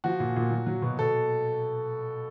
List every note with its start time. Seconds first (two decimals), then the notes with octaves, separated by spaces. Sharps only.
0.04 F3 F#4
0.20 A#2
0.36 A#2
0.51 F#3
0.66 F#3
0.82 B2
0.98 B2 A4